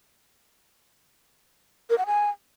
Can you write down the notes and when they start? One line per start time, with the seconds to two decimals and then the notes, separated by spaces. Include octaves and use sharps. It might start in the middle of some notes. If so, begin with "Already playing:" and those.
1.90 A#4
1.98 F#5
2.06 G#5